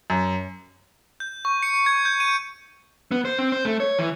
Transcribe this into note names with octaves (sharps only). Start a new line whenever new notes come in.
F#2
G6
C#6
C#7
G#6
G6
D#7
B3
C5
C4
C5
A3
C#5
E3